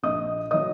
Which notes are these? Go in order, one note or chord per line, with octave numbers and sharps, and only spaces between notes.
A#1 D#5 D#6
D#3 F#3 D#5 D#6